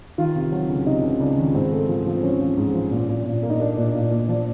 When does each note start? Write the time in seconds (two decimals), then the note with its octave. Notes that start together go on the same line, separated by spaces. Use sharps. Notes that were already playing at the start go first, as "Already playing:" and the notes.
0.18 D#3 F4
0.35 C3
0.52 F#3
0.69 C#2
0.86 C3 D#4
1.03 C#2
1.20 C#2 D4
1.37 D#3
1.54 G#2 C4
1.72 A3
1.89 F3
2.06 F3
2.17 C4
2.23 F3 C#4
2.40 F3
2.57 G#2
2.74 F3
2.91 A#2
3.09 A#2
3.26 A#2
3.43 A#3
3.50 D#4
3.60 A#3 D4
3.77 A#2
3.94 A#2
4.11 A#2
4.28 F3 D4